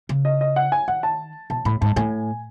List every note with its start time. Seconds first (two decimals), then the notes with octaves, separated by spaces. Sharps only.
0.09 C#3
0.25 D#5
0.41 D#5
0.56 F#5
0.72 G#5
0.88 D#3 F#5
1.03 A5
1.50 B2 A5
1.65 A2 B5
1.81 G#2 A5
1.96 A2 G#5